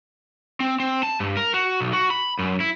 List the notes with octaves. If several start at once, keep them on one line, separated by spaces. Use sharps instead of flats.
C4
C4
A5
G2
A#4
F#4
B1
F#4
B5
F#2
E4